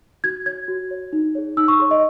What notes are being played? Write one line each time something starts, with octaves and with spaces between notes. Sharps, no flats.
F#4 G#6
C#5 G#6
F#4
C#5
D#4
G#4 C#5
D#4 E6
C#6
G#4 C#5 C6
D#5